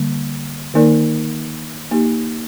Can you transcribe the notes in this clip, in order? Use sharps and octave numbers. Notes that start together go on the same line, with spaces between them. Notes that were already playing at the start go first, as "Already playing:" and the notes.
Already playing: D3 G3 A#3
D#3 A#3 D#4 A#4 D5
A#3 D#4 G4